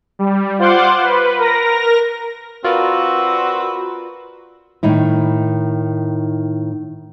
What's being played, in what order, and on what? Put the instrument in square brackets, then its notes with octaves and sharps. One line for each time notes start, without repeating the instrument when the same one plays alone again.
[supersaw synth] G3
F4 C5 F#5 C6 D6
B4
A#4 A#6
[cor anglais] C4 [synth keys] F4 A#4 D5 [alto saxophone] F#4 [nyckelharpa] B4
[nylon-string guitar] A2 D#3 D#4 E4